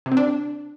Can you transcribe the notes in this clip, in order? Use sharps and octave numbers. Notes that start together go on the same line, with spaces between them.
C3
C4
D4